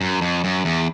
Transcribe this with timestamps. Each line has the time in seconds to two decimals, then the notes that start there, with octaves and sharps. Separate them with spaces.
0.01 F#2
0.21 F2
0.44 F#2
0.65 E2